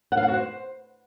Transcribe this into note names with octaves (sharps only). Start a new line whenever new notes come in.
F#5
F5
F#5
F#4
C5